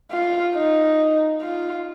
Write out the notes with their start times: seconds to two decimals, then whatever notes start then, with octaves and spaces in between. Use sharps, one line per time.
0.12 F4
0.54 D#4
1.42 F4